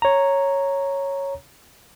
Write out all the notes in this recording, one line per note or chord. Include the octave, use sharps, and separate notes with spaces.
C#5 A#5